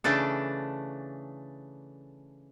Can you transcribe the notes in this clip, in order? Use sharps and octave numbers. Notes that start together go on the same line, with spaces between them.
C#3 E3 A3 D4 A4